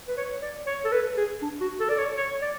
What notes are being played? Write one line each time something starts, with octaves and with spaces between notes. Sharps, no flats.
B4
C#5
D5
C#5
A4
B4
G#4
D4
F#4
A4
D5
C#5
C#5
D5